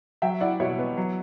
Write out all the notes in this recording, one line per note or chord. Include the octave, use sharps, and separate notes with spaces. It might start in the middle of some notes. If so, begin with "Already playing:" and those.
F#3 E5 G5
E4 D5 F#5
B2 C#5 E5
B3
F#3